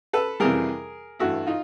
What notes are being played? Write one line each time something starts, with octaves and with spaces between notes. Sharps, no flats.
A4 B4
F2 C3 E3 G3 G#4 A#4
G2 E3 A3 E4 F#4
D#4 F4